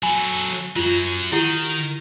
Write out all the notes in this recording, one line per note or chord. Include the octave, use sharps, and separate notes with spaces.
F#3 A4 G#5 B5
F#2 F#3 F4
D#3 E4 G4 F#5